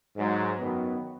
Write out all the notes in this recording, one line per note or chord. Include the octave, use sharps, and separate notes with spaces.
G#2 F#3
F#2 D#3 F#3 B3